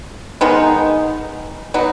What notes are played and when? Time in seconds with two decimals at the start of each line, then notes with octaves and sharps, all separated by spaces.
0.41 D#3 G#3 B3 D#4
1.74 F#3 B3 D#4